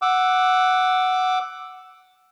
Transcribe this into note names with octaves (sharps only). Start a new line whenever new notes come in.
F#5 D6 E6